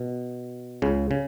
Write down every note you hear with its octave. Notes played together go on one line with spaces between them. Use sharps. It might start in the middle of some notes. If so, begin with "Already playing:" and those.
Already playing: B2
C#2 C#3
C#3